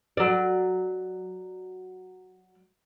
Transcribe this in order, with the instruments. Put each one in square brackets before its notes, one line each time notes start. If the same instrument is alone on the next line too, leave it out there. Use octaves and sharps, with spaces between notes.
[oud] F#3 D5